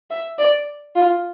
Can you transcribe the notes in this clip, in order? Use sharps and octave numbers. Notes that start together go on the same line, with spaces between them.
E5
D5
F4